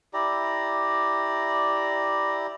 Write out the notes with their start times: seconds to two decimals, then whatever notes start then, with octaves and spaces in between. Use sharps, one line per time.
0.13 E4 G4 D5 A#5